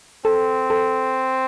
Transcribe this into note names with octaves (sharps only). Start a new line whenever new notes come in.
C4 A4
A4